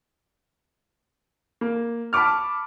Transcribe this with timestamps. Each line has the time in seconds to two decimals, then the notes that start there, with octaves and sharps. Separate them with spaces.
1.61 A#3
2.13 A5 B5 C#6 D6 F6